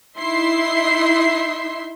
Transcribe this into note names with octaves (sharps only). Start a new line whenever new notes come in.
D#4 E4 E5 C6 C7